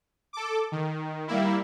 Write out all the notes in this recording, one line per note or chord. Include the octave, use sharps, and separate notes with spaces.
A4 D6
D#3
G3 A#3 E4